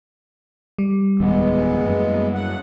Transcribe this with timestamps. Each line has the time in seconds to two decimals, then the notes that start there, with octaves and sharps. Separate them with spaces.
0.78 G3
1.20 D1 E2 D#3 G#3 B3
1.85 F#2 A#3
2.34 F#5